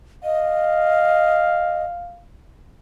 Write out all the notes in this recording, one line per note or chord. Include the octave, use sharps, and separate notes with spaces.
D#5 F5